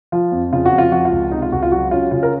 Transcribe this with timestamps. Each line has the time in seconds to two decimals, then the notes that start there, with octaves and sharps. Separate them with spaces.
0.12 F3 F4
0.32 F2
0.52 C#3 F4
0.66 F#4
0.72 F2
0.78 F4
0.91 F3 F#4
1.05 F4
1.12 C#2
1.31 C3 D#4
1.42 F4
1.52 C#2 F#4
1.63 F4
1.72 F#3 F#4
1.91 C#4 F4
2.11 C#3 F4
2.23 A#4